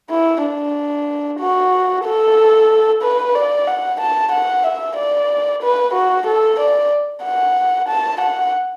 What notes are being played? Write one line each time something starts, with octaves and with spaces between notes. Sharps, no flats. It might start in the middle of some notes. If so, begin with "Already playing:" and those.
E4
D4
F#4
A4
B4
D5
F#5
A5
F#5
E5
D5
B4
F#4
A4
D5
F#5
A5
F#5